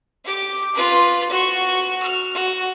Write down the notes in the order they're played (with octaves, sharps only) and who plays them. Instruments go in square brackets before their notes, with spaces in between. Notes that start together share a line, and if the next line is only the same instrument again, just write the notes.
[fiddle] G4 D6
F4 B4
F#4 C#6
F6
F#4